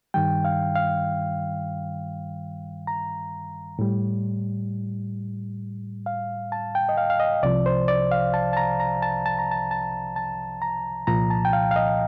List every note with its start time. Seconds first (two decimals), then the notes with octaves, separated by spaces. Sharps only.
0.14 G2 D#3 G3 G5
0.45 F5
0.75 F5
2.87 A#5
3.79 A2 G3
6.06 F5
6.52 A5
6.75 G5
6.89 D#5
6.98 F5
7.10 F5
7.20 D#5
7.43 C2 C3 F3 D5
7.66 C5
7.88 D5
8.12 F5
8.34 A5
8.53 A5
8.57 A#5
8.80 A#5
9.03 A5
9.26 A5
9.39 A#5
9.51 A5
9.71 A5
10.16 A5
10.62 A#5
11.07 C2 A#2 F3 A#5
11.30 A5
11.45 G5
11.53 F5
11.71 F5
11.76 D#5